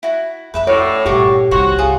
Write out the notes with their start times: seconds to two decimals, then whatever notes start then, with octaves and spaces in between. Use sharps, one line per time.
0.03 E4 F#4
0.54 F2 B4 E5 B5
0.67 A2 F#4 C#5 D5
1.06 G2 A#2 F#4 G4 C#6 D6
1.51 C2 D#3 F#4 C5 C#5
1.79 C2 F4 G#4